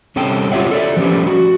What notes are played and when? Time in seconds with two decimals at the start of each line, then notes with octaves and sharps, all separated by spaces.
0.16 C2 C3 C#4 A4 G5
0.52 F4 G4 C#5 E5 F#5
0.71 A4 D5 E5
0.97 F3 G3 A3 C#4 G4
1.27 F#4